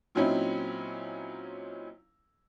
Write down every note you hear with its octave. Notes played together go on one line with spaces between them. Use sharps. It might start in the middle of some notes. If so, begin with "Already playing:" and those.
A#2 F#3 C4 C#4 D#4 E4